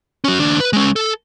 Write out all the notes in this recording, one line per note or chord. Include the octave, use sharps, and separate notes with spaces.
C#4 F#4
D#2 D4
B4
G#3 C#4
A4